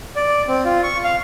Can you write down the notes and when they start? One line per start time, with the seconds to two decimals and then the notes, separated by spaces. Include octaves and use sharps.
0.16 D5
0.48 C4
0.64 F4
0.83 C#6
1.04 F5